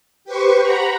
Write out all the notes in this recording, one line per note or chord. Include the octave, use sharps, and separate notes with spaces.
G4 B4 C5 C#6
F#5 A#5 B5